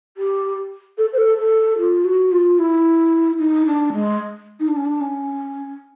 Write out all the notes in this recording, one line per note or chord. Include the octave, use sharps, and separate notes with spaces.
G4
A4
C5
A4
A4
F4
F#4
F4
E4
D#4
D4
G#3
D#4
D4
C#4
D4
C#4